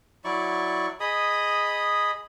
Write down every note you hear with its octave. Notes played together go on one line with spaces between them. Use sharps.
F#3 E4 D5 C#6
G#4 D#5 B5 D#6